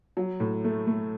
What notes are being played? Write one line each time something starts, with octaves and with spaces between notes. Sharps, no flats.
F#3
A2
A3
A3